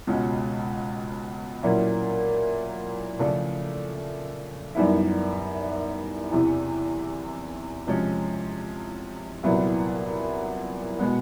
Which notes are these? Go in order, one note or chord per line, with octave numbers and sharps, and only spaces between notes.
C#2 B2 G#3 C#4 F4
A#2 F#3 A#3 C#4 E4
C#3 F3 A3 D4
F#2 D#3 G3 B3 E4
E2 C3 E3
C3 F3 G#3 C#4
C2 A#2 F#3 B3 E4
B2 G#3 B3